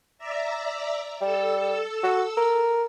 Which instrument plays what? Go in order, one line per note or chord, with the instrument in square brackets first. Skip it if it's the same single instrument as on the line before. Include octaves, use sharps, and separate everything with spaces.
[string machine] D5 E5 A#5
[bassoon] G3 [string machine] A4 E6
[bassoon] F#4
A#4